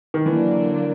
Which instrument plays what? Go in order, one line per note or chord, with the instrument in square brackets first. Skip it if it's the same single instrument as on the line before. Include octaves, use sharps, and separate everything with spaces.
[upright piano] D#3
[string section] D3 F#3 A#3 D4 [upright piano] E3